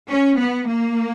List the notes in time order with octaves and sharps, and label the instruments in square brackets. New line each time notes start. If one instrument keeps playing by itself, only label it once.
[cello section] C#4
B3
A#3